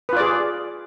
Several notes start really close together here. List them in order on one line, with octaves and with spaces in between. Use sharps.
B4 F4 D5 G#4